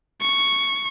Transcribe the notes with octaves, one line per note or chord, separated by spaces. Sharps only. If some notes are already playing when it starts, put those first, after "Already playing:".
C#6